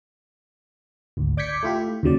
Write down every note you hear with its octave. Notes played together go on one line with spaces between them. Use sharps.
G#1 D2
D5 D6 G6 G#6 B6 C#7
A3 E4 F4 G4
D#2 C#3 F#3 D5